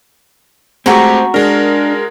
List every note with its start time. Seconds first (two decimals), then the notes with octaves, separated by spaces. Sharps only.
0.86 G#3 A3 C4 F#4 G4 A#5 C#6
1.34 G#3 D4 A#4